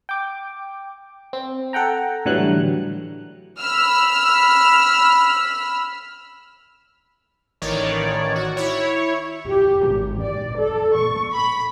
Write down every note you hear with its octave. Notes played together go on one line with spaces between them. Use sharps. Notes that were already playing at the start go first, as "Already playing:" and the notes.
G5 D6
C4
A4 F#5 G5 A#5
A2 D3 E3 F#3 G3 F#6
B5 E6 F6
A1 D#3 C#5 D5
F#4
E4 C#5
G4
G#1
D5
A4
C#6
B5